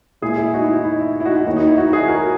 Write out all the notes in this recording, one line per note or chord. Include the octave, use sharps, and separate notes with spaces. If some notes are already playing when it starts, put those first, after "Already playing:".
A#2 G#3 E4 G#4
E4 G#4
D#4 F#4
E4
D#4
E4
E4
E4
D#4 F#4
D#4 F#4
D#2 D#3 A#3 E4
D#4
E4
D#4 F#4
F#4
E4 G#4
F#4 A#4